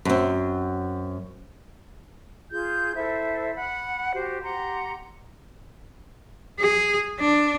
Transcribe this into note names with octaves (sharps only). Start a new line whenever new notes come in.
F#2 C4
F4 G#4 G6
E4 A4 C5 E5
F#5 B5
F#4 G4 C5
G4 F#5 A#5 C6
G#4
D4